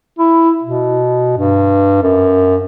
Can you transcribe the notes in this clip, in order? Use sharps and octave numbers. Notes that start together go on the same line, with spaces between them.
E4
B2
G2
F#2